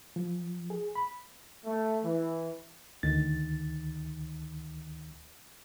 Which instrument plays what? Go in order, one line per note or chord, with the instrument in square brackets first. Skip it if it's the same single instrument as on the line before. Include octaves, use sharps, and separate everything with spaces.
[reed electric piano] F3
G#4
B5
[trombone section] A3
E3
[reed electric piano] D2 D#3 A6